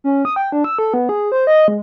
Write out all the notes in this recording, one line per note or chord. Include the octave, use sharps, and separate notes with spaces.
C#4
D#6
G5
D4
E6
A4
B3
G#4
C5
D#5
G#3